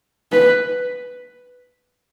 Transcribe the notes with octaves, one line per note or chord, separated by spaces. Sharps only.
B4